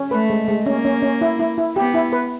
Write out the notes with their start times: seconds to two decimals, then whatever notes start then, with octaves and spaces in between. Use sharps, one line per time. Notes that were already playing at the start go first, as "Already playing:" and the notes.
Already playing: C#4
0.11 A3 B4
0.30 G#3
0.48 G#3
0.66 A#3 C#4
0.85 C#4
1.03 C#4
1.21 E4
1.39 E4
1.58 E4
1.76 B3 G4
1.94 E4
2.13 B4